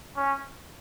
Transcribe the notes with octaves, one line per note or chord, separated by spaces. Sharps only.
C#4